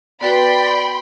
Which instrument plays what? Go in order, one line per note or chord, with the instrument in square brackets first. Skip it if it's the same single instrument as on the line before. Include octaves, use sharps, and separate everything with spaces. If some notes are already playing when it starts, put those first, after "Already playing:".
[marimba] B3 F#4 B4 [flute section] D5 [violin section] G5 B5 C6